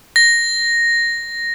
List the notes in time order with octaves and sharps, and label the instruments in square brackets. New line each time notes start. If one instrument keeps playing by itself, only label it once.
[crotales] A#6